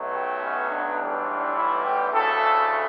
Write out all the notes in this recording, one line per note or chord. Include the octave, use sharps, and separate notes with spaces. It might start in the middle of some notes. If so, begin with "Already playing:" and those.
Already playing: B1 B2 F#3 A3
G4
C#4
D4
B1 A2 E3 G3 B3
E4
G4
D2 C#3 E3 A3 A4